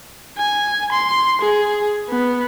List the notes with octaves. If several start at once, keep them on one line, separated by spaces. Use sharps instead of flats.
G#5
C6
G#4
B3